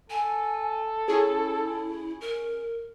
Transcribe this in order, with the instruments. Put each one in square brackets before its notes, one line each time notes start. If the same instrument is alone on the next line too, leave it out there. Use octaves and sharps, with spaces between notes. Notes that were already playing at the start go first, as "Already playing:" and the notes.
[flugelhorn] A4 [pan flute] G#5
[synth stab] C#4 G#4 [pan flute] E4
[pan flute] A#4